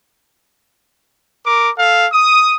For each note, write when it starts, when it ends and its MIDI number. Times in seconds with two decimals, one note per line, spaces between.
1.46 1.70 70
1.46 1.70 86
1.77 2.06 69
1.77 2.06 77
2.12 2.56 87